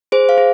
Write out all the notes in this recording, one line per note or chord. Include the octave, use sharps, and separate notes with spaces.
G#4 C5
F5
G#4